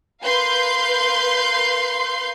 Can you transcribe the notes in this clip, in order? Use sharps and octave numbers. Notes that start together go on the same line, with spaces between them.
A#4 B4 F5 C6 G6